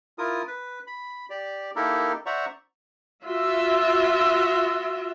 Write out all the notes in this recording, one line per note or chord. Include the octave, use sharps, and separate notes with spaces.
E4 F4 A#4 D#6
B4
B5
G4 D5
A#3 D#4 E4 G4 A4 A#4
C5 D5 E5 F#5 A#5 C#6
F4 F#4 E5